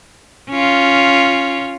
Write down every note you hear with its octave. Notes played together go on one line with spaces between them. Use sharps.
C#4 F4